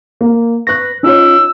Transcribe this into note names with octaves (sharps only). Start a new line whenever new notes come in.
A#3
B4 C#6 F#6 A#6
C#4 D#4 F4 C#5 E6